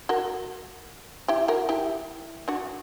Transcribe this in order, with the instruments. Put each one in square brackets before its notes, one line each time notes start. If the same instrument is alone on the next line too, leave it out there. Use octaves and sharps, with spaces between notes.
[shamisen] F#4 A#4
E4 G4
F#4 A#4
E4 G4
D4 F#4